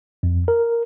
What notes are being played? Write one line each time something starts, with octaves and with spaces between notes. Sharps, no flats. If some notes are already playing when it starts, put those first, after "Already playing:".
F2
A#4